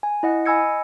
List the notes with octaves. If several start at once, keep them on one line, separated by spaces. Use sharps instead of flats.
G#5
E4 D#5 F#5
D#5 G#5 B5 E6 G#6 C#7